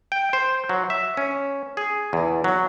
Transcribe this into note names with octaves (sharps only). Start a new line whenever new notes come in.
G5
C5
F#3
E5
C#4
G#4
E2
F#3